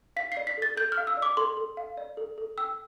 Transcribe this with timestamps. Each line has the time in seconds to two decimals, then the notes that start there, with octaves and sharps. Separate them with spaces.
0.16 F5 B6
0.32 C7
0.37 D5
0.47 B6
0.58 A4 A6
0.77 A4 G6
0.92 F6
0.98 F5
1.07 E6
1.17 D5
1.22 D6
1.37 A4 C6
1.57 A4
1.77 F5
1.97 D5
2.17 A4
2.38 A4
2.58 G5 E6